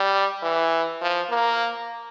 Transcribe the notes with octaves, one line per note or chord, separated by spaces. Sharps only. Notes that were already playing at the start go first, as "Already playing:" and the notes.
Already playing: G3
E3
F3
A#3